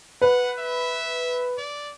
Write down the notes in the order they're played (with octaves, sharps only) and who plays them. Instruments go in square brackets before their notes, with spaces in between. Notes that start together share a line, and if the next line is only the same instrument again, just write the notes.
[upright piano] B4 [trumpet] F#5
[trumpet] E5
D5